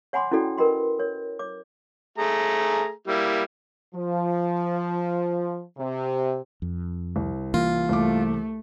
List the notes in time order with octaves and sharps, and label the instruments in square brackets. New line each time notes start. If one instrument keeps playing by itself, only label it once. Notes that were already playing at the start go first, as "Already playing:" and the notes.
[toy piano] C#5 F#5 G#5 B5 C6 D6
C#4 E4 F#4 A4 D5 G5
A#4 B4 D#5 G5 B5 C6
A#4 C#5
C#5 D6
[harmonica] A3 G#4 A#5
G3 A#3 E4
[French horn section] F3
C3
[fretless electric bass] F2
[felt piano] C2
[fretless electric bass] E3 A#3 [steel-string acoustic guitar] F4
[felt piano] C2 D6 [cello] A3